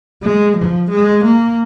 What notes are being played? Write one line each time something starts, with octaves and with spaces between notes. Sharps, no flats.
G#3
F3
G#3
A#3